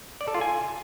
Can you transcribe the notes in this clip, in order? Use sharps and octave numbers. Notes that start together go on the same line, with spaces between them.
D5
A4
F4
G#5